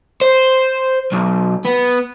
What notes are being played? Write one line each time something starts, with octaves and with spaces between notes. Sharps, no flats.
C5
B1
B3